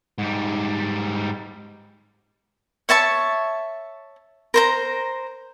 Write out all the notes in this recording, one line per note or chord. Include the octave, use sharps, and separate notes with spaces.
G#2 G3
C#5 E5 A5 C#6
A#4 C5 A#5